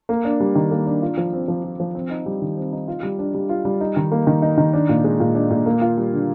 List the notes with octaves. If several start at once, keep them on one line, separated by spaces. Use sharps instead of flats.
A#3
D4
G3
D#3
A#3
D4
F4
F3
C4
F3
F4
F3
C4
D#4
G3
D#3
C4
D#4
F4
G3
D4
G3
F4
G3
D#4
D#3
A#3
D#3
D#4
D#3
D4
A#2
G#3
A#2
D4
A#2
A#3
F4
G3
D3